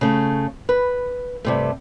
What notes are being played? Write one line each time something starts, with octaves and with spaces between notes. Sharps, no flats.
C#3 A3
B4
G2 C3 A3